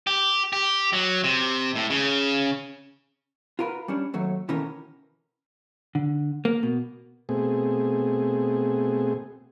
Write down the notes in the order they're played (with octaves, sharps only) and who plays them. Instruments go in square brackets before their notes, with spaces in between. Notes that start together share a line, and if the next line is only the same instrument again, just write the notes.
[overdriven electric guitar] G4
G4
F#3
C3
A2
C#3
[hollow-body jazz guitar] F4 F#4 A#4 B4
G3 C#4 D4
D#2 F#3 A3
B2 D#3 E3 A3 C#4 A#4
D3
A#3
B2
[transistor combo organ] B2 A3 C4 G#4